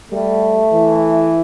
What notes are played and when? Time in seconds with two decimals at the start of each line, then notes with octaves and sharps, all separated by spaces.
0.12 G3 A3
0.72 E3